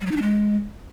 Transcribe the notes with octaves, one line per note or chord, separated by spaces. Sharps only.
G3
F#3
D#4
D4
G#3